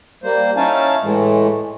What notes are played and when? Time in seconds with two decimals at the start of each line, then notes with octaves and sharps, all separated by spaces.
0.23 G3 A#3 C5
0.57 C#4 D#4 E4 F5 G#5 A5
1.04 A2 E3 G#3 A3